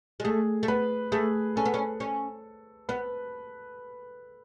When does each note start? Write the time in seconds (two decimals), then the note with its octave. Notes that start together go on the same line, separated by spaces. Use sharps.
0.20 G#3
0.24 A3 G#4
0.63 A3
0.68 B3 B4
1.12 A3 G#4
1.56 C#4 A4
1.65 B3
1.74 C#4
2.00 C#4
2.89 B3 B4